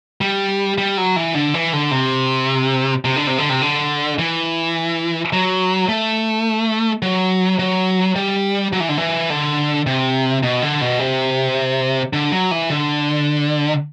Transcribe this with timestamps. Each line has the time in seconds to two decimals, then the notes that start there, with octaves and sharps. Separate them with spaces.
0.21 G3
0.78 G3
0.98 F#3
1.16 E3
1.34 D3
1.54 E3
1.73 D3
1.91 C3
3.05 C3
3.16 D3
3.27 C3
3.38 D3
3.49 C3
3.62 D3
4.19 E3
5.33 F#3
5.89 A3
7.02 F#3
7.59 F#3
8.16 G3
8.73 F#3
8.80 E3
8.89 D3
8.98 E3
9.30 D3
9.87 C3
10.43 B2
10.62 D3
10.81 B2
10.99 C3
12.13 D3
12.32 F#3
12.51 E3
12.70 D3